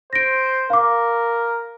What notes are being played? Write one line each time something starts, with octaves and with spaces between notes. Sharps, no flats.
C5 A#6 D7
A#4 F5 D6